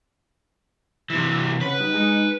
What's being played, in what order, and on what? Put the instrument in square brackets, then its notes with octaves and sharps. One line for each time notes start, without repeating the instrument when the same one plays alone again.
[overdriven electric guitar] C3 E3 [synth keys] E6
[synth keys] G4
[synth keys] C#3 F#5 [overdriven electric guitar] B4
[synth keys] G3 D#4
G#3 D#4 C#7